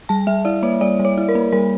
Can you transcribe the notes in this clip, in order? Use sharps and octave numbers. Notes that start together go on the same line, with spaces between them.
G3 A5
G3 E5
E4 D5
A#3 C#5
G3 D5
G3
C#5
E4
A#4
A#3
G3 A#4